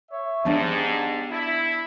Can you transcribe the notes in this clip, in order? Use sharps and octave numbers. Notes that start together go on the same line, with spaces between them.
C#5 E5
G#2 B3 D4 G4 D5 A5
E4